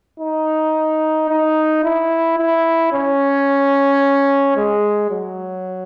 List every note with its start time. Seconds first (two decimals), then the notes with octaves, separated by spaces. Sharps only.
0.20 D#4
1.30 D#4
1.84 E4
2.38 E4
2.93 C#4
4.57 G#3
5.11 F#3